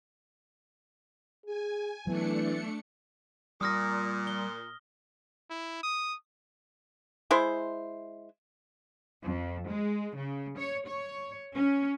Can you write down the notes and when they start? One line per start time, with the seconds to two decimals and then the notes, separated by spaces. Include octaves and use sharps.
1.46 G#4 G#5
2.07 E3 F#3 A3 B3 D4 C#7
3.61 A#2 G3 D#6 F6 A#6
4.27 G7
5.50 E4
5.83 D#6
7.31 G#3 E4 C5
9.24 F2
9.68 G#3
10.17 C#3
10.58 C#5
10.88 C#5
11.55 C#4